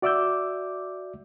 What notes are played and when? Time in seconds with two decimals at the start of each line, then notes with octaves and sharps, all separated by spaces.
0.02 F#4 D5 E5 D6 E6 G6